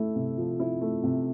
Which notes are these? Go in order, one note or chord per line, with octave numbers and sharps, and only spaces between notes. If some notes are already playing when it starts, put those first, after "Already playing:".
Already playing: A3 E4
C3
F3
E4
A3
C3